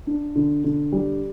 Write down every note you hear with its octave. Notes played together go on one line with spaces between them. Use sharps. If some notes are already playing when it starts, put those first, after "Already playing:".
D4
D3
D3
G3